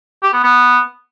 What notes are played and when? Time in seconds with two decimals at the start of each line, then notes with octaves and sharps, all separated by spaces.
0.23 G4
0.33 B3
0.43 B3